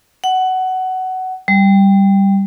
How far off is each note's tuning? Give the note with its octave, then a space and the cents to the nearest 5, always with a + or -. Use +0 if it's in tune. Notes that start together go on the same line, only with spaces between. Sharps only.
F#5 +15
G3 +5